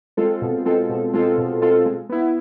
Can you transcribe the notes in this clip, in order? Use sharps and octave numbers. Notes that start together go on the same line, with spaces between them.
G#3 C4 F4 A4
B2
G#3 C4 F4 A4
B2
G#3 C4 F4 A4
B2
G#3 C4 F4 A4
G#3
B3 E4